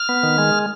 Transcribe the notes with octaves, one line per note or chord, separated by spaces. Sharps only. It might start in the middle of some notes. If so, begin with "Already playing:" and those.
Already playing: F6
B3
D#3
G#3